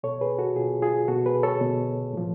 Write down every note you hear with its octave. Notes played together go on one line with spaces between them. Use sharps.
B2 A4 C#5
G#4 B4
F#4 A4
B2 F4 G#4
F4 G#4
B2 F#4 A4
G#4 B4
A4 C#5
B2
A2 F3